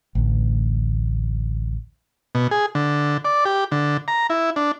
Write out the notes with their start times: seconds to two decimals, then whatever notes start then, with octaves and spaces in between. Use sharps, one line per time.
0.15 A1 D2
2.35 B2
2.51 G#4
2.75 D3
3.25 D5
3.45 G4
3.72 D3
4.08 A#5
4.30 E4
4.56 D4